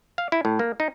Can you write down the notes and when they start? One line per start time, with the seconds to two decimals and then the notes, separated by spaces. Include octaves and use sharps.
0.18 F5
0.32 E4
0.45 A2
0.59 A#3
0.80 D#4